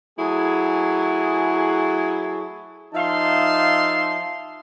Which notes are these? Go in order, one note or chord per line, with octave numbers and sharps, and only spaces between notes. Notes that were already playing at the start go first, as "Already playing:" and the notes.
F#3 A3 E4 G#4
F3 D#4 E5 F5 A5 C6